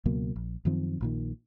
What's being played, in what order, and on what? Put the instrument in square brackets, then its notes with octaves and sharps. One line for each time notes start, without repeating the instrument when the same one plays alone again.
[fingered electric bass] C#2 B2 F#3 A#3
A#1
F#2 D#3 F3 C4
A#1 A#2 D#3